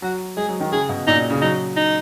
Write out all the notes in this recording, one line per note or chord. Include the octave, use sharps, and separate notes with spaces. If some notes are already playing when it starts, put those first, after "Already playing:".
F#3 F#4
G#3 G#4
F#3
D#3
C#3 G#4
B2
A#2 D#4
C#3
F#3 D#4
D#4